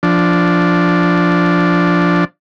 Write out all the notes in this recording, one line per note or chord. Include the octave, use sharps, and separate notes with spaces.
F3 D4